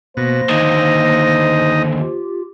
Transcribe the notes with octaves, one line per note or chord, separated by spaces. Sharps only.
B2 A#3 C5 A#6
D#2 D3 D#4 D#5
F4 G4